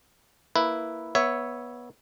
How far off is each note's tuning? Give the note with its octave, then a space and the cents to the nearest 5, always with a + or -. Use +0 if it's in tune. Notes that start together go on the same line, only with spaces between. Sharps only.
A#3 +0 E4 +0 B4 +0
B3 -15 C#5 +0 E5 +0